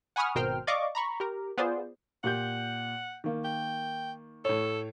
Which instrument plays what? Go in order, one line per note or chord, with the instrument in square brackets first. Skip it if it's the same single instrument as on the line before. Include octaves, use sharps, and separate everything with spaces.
[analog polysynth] F#5 G#5 B5 C#6 D#6 F6
G#1 B2 A#4 C5 G5 F6
D5 D#5 F5 C#6 D6
A#5 B5 C#6
G4 A#4
B3 F4 G#4 C5 D5
[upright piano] A#2 G4 G6 [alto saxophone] F#5
[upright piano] D#3 A#3
[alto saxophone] G5
[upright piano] A2 C#5 [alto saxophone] A4